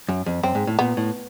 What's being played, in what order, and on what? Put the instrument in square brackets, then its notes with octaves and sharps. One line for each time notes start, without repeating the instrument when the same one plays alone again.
[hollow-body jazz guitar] F#2
F2
[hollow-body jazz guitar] F#2 [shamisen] C4
[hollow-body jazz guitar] G#2
A2
[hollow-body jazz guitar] A#2 [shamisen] B3
[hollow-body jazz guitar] A2